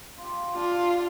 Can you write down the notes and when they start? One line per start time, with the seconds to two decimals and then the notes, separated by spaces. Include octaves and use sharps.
0.18 F4 G4
0.56 D4 F4 G4 D6